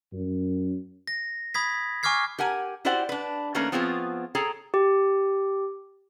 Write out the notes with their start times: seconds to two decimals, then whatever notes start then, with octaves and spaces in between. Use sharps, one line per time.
0.12 F#2
1.07 A#6
1.54 B5 D#6 G#6 B6
2.03 G#5 C#6 D6 F6 G#6 C7
2.39 G4 A#4 F#5 G#5
2.85 E4 F#4 G4 C5 D5 F#5
3.09 D4 B4
3.55 D#3 A3 A#3 C#4 A#4 B4
3.72 F3 B3 C4 F4 G#4 C#5
4.35 G#4 A4 C#5 G5 A#5
4.74 G4